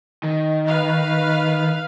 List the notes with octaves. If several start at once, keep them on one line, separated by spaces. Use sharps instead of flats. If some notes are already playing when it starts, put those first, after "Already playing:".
D#3
B4 F5